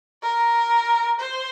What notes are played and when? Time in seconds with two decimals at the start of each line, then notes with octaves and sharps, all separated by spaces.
0.22 A#4
1.20 C5